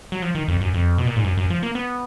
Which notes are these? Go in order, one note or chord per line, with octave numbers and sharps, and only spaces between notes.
F#3
F3
D#3
F2
F#2
F2
B2
A#2
G#2
F#2
F#2
F3
A#3
B3